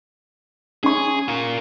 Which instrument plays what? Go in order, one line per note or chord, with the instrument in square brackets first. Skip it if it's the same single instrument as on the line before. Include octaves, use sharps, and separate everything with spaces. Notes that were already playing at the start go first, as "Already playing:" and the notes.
[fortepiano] C#4 C#6 [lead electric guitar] G#4
[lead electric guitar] F4 A#4